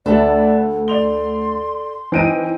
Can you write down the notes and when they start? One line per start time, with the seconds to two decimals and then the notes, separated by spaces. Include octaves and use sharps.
0.06 D2 A4 B4 D5 E5 F#5 A5
0.88 D5 C6 F7 G7
2.12 E3 C4 D#4 D7 D#7